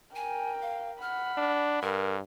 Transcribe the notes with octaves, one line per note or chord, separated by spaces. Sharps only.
A#4 G5 G#5
F5
F#5 B5 F6
D4
G2 A#4